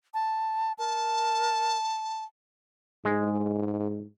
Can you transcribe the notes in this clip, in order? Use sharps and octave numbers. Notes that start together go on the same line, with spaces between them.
A5
A#4 A5
G#2 G#3